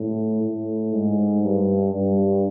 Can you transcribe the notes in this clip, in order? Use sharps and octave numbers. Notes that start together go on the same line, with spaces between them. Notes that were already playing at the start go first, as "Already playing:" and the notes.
Already playing: A2
A2
G#2
G2
G2